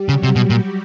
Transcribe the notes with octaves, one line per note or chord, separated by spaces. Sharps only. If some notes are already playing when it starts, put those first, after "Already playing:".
Already playing: G3 G4
C#3 F#3 F#4
C3
B2
A#2